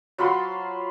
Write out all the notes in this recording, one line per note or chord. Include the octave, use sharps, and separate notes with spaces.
F#3 F4 B5 C6